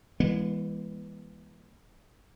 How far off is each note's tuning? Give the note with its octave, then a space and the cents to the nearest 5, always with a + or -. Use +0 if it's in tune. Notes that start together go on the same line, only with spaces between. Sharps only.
E3 +10 G#3 -25 B3 -40